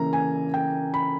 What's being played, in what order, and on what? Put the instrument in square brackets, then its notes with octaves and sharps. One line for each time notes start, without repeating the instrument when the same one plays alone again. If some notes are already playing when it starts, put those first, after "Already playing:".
Already playing: [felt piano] C#3 E3 A#3 A#5
G#5
G5
B5